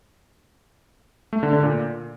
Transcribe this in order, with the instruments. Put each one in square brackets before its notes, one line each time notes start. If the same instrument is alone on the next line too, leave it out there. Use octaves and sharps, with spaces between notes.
[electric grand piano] A3
D3
D3
A#2